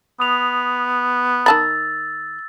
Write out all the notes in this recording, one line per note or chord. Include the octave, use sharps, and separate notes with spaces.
B3 D#6 F7
D#3 A5 B5 E6 A6